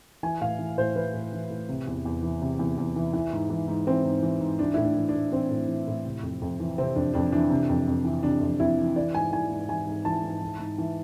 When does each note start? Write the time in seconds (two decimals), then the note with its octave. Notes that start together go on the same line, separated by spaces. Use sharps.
0.23 E3 G#5
0.41 A2 F5
0.59 E3
0.77 A2 C5
0.95 E3 B4
1.14 A2
1.33 E3
1.50 A2
1.69 C3
1.87 E2
2.05 E2
2.23 E3
2.42 C3
2.59 E2
2.78 E2
2.96 E3
3.13 E3
3.33 G#2
3.50 E3
3.68 G#2
3.87 E3 C4
4.04 G#2
4.23 E3
4.41 G#2
4.59 E3 D4
4.74 A2 E4
4.84 D4
4.96 E3
5.09 D4
5.14 A2
5.32 E3 C4
5.50 A2
5.68 E3
5.88 A2
6.05 C3
6.23 F2
6.42 F2
6.60 E3
6.78 C3 C4
6.95 F2 D4
7.14 F2 D4
7.32 E3 D4
7.50 C3
7.69 F2
7.88 F2
8.05 E3
8.23 C3 D4
8.41 F2
8.60 F2 E4
8.78 E3
8.96 E3 D5
9.14 G#2 G#5
9.33 E3 G#5
9.51 G#2
9.69 E3 G#5
9.87 G#2
10.05 E3 A5
10.23 G#2
10.42 E3
10.59 G#2
10.78 E3